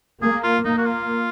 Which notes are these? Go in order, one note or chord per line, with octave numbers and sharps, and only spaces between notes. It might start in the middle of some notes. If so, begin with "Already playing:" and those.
A#3 G#4
F4
A#3 D#4
F#4
F4